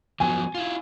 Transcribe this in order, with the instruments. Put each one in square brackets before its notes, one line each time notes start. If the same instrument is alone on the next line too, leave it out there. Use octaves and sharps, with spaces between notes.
[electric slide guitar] F3 F#3 B3 [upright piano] G#5
[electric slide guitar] E4 F4